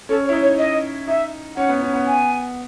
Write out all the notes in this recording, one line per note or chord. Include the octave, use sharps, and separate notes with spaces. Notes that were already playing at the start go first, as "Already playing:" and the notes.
C#4 A4
C#5
E4
D#4
C#5
D#5
D#4 E5
C#4 F#5
B3
C#4
B3
G#5